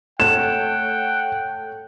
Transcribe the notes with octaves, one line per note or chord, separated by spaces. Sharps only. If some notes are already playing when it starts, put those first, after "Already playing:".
A3 A4 C#5 F#5 G5 E7